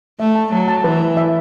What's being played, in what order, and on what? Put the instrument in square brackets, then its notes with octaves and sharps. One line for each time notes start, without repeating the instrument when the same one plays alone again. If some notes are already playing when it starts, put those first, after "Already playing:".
[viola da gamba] A3 [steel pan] E5
[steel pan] A5
[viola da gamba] F#3 [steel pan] A5
[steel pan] A5
[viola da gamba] E3 [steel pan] B4
[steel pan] B4
E5